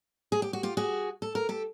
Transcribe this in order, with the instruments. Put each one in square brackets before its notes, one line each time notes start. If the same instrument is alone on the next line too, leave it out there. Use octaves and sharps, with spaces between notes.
[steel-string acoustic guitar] G#4
G4
F#4
F4 G4
F#4 G#4
A4
A#4
G4 A4